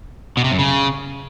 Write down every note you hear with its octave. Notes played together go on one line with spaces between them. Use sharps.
B2
C3
F#2
C#3